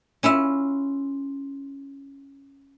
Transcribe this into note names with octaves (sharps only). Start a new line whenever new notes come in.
C#4 E4 F4 E5